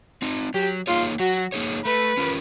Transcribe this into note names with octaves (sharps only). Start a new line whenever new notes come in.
C4 D#4
F#3 G4
A#3 D#4 F4 G#4 C#5
F#3 F#4
A#3 D#4 G#4 C#5
A3 B4
C#4 F4 A#4